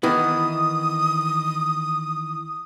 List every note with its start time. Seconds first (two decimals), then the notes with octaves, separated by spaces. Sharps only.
0.03 D#3 E3 B3 D#6